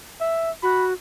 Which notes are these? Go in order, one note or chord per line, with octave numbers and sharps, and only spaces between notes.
E5
F#4 B5